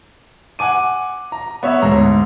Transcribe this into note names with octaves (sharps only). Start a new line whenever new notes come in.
F#5 G#5 D6 D#7
A#5
B3 C#5 E5
D2 G#2 A#5